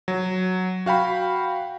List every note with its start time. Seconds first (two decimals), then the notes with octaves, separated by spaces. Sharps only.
0.08 F#3
0.86 F#4 F5 G5 B5